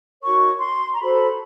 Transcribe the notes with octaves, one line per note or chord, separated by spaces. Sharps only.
D#4 F#4 A#4 C#5 C#6
C6
A#5
F#4 A4 C5 B5